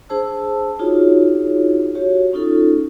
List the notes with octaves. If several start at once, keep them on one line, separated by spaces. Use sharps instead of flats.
D4 G#4 C5 A5 E6
D4 D#4 F4 F#4 G#4 C#5
F#4 G4 C#5
C#4 D#4 F4 A4